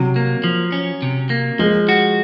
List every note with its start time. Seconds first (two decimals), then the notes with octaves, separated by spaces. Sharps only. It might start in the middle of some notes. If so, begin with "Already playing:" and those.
Already playing: C3 F#3
0.16 A#3
0.44 F3
0.72 C#4
1.02 C3
1.30 A#3
1.59 F3 G#3
1.89 F#4